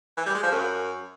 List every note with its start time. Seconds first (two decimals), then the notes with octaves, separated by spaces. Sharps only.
0.17 E3
0.26 G3
0.35 G#3
0.43 F3
0.52 F#2